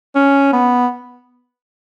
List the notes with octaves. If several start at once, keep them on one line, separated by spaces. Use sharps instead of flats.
C#4
B3